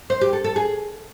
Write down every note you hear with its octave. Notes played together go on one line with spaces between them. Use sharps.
C5
G4
A4
A4
G#4